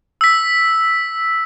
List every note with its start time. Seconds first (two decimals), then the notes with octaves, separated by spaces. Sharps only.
0.21 E6 B6